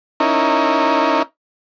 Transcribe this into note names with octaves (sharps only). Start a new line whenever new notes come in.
C#4 D#4 E4 A#4